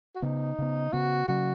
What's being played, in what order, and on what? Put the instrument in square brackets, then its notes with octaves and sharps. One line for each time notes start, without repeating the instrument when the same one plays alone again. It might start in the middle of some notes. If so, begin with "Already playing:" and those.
[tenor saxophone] F#4
[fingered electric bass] C#3 B3 [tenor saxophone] D#4
[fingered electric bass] C#3 B3
[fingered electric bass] C#3 B3 [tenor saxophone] F#4
[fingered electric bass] C#3 F#3 C#4 [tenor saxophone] F#4